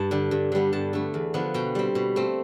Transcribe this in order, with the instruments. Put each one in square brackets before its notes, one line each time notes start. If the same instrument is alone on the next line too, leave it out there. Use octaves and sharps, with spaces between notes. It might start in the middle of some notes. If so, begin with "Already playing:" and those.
Already playing: [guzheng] G2 A5
D3 G3
G2
D3 G3 B3
G2 A5
D3 A3
E2
D3 F3 B3
B2 G5
G3 C4
B2
A3 C4